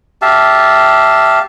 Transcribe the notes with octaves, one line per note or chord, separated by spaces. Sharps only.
G4 E5 F5 A5